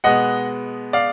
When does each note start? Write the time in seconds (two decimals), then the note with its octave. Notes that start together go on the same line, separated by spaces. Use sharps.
0.04 B2 G#3 B3 D#5 F#5
0.93 D5 F5